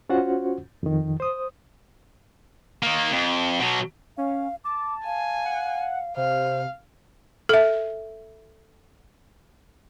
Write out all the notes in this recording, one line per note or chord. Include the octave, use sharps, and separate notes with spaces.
C#4 F4 F#4 C5 F#5
F2 D#3
C5 D#6
D#3 A#3
F2
B2 F#3
C#4 F5
A5 D6
F5 G#5
F#5
C3 C5 F5
A4 E5